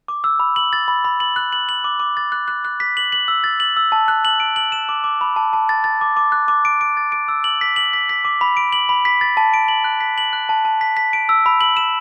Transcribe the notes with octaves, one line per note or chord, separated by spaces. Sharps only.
D6
E6
B5
F#7
A6
B5
B5
F#7
F#6
F#7
F#7
D6
D6
A6
F#6
F#6
F#6
B6
F#7
F#7
E6
A6
F#7
E6
A5
F#6
F#7
D7
F#7
E7
D6
D6
B5
A5
A5
A6
A6
D6
D6
F#6
D6
D7
D7
A6
D7
E6
F#7
B6
F#7
B6
B6
D6
B5
D7
F#7
B5
B6
A6
A5
D7
F#7
F#6
B6
F#7
F#6
A5
A5
B6
B6
D7
E6
B5
F#7
E7